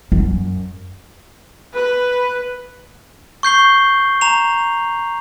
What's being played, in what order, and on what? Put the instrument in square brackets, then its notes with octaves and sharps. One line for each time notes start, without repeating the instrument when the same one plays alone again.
[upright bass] F#2
[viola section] B4
[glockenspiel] C#6 G6 C7 G7
A#5 F7